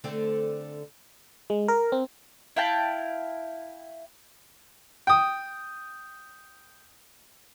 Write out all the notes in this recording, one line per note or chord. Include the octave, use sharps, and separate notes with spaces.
D3 A3 C4
G#3
A#4
C4
E4 F5 G5 A5
G5 D#6